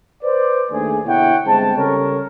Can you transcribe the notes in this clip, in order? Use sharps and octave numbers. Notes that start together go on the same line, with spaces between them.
B4 C5 D5
D#2 A3 D4 G#4
B2 D3 E4 C#5 F#5 G5
G1 G#3 C4 A5
C#3 G3 A4 A#4 C#5